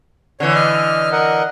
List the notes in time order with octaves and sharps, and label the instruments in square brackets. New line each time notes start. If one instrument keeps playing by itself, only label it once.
[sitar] D3 E3 [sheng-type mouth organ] C#5
[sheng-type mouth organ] D#5 F6
A#4 D#5 F#5